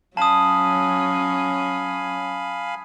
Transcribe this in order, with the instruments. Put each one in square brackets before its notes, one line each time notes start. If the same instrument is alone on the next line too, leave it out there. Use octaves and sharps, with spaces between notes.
[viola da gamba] F#3 C#4 [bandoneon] F5 G#5 B5 [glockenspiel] A5 D#6